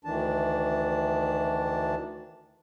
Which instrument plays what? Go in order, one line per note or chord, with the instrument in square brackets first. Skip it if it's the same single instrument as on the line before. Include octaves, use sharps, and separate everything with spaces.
[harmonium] D2 D#3 E3 D4 A5